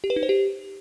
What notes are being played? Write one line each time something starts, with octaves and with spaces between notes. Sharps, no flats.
G4
B4
D#4
C5
G4